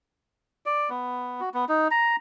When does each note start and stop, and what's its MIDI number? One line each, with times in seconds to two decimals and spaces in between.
0.66 0.90 74
0.90 1.41 59
1.41 1.49 66
1.54 1.65 59
1.69 1.88 63
1.91 2.16 82